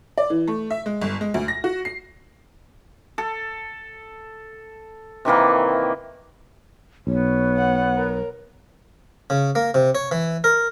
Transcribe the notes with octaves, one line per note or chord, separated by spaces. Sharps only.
D5
E3
A3
E5
G#3
G1
G#3
D2
A#6
F#4
C7
A4
C3 D#3 E3 A#3
B1 B3 C#5
F#5
A#4
C#3
A#3
C3
C#5
E3
A#4